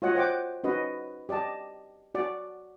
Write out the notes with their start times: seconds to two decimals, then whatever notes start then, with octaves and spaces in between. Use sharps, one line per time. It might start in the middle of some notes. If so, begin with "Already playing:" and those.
0.02 F4 F#4 C#5 D#5 F#5
0.15 C5 F#5 G5 D6
0.64 C#4 D#4 F#4 B4 D#5
1.29 G4 D5 D#5 A5
2.15 F#4 D5